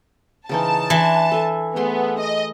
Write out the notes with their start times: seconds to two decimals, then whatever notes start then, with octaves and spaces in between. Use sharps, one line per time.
0.49 C#3 E3 D#4 A5
0.90 E3 D4 C6
1.31 A4 G#5
1.76 A3 B3 G#4 C6
2.18 D#5